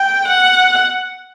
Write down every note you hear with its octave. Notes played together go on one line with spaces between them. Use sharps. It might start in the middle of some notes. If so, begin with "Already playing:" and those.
Already playing: G5
F#5